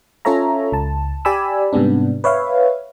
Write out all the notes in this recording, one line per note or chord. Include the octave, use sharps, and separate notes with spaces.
C#4 F4 A4 C#5 E5 A#5
C#2 A5
G4 D5 G#5 B5 E6
G#2 C3 G3 B3 D4
B4 C#5 E5 F5